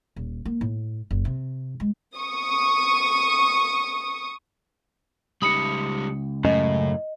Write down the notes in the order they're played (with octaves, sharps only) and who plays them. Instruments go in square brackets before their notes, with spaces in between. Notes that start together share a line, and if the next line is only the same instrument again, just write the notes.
[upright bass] D#1
A#3
A2
F#1
C3
G#3
[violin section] C#6 D#6
[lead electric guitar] C#2 B5 [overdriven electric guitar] G3 D#4 [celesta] D#6 C#7
[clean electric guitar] F#2 C#3 [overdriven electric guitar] A2 [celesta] D#5